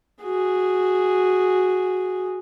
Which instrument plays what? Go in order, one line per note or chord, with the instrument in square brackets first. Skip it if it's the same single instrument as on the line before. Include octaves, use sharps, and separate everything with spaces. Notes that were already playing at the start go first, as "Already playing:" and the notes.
[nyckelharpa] F#4 G#4